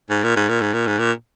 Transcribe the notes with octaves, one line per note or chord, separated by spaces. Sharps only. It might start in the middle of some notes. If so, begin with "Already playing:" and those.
G#2
A#2
G#2
A#2
G#2
A#2
G#2
A#2